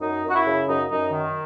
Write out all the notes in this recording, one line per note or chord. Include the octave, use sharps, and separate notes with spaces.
F#2 D#4
F#2
F#4
E4
C#3
F#2 D#4
F#2 D#4
D#3